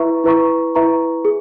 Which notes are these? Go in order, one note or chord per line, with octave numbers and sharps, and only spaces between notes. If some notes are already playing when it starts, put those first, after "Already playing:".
Already playing: E4 B4 E5 A#5 C#6
E4 B4 E5 A#5 C#6
E4 B4 E5 A#5 C#6
G#4